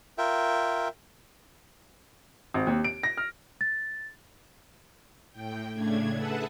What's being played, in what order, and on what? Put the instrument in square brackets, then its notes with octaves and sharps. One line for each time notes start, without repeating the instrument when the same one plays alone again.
[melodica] F4 A#4 E5 G5
[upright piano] G#1
D#2
D7
A#6
F6
[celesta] A6
[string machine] A2 G5
A2 C#3 A3 D4 G#6
G#4 A4 B4 E5 F#5 A5